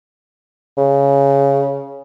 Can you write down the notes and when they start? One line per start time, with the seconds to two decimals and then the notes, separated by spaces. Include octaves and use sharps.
0.78 C#3